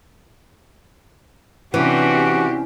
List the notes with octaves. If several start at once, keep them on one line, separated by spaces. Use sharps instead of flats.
C3 E3 C#4 D4 F#4 G4